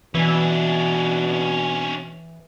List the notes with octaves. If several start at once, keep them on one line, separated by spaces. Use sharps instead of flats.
B2 E3 C#4 D4